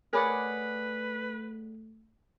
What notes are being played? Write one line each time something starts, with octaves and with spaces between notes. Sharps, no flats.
A3 G#4 A#4 B4 C#5 D5 F#5 B5